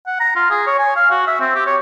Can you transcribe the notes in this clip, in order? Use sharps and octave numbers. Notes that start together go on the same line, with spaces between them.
F#5
A#5
F4
G#4
C#5
G#5
F5
F#4
E5
C4
G4
C#5